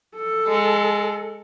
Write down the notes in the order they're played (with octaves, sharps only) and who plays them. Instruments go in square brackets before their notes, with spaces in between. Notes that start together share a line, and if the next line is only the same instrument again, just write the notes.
[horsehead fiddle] A4
[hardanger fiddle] G#3